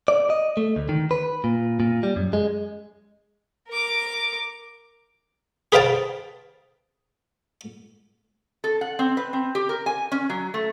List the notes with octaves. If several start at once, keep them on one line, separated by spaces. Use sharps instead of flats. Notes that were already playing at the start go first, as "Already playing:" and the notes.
D5
D#5
A3
D2
D#3
B4
A#2
A#2
G3
F#2
G#3
A#4 D6
G#4 B4 C5 F5 G5 A5
A4
F#5
C4
B4
C4
G4
A#4
G#5
C#4
F#3
A3